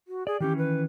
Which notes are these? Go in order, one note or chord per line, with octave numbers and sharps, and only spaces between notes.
F#4
G#4 D5
D#3 E3 C#4 G4
B4